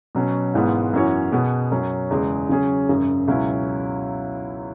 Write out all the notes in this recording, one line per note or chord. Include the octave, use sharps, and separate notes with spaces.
B2 F#3 C#4
G#1 G#2 E3 G#3 B3
F#2 E3 C#4 F#4 C#5
B2 B3 G#4
F#2 F#3 C#4
E2 C#3 G#3
C#3 F#3 C#4 G#4
G#1 F#2 C#3
C#2 B2 F#3 C#4 E4